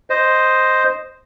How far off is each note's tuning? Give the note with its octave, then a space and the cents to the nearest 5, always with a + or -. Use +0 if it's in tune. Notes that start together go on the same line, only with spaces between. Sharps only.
C5 +0 D#5 +0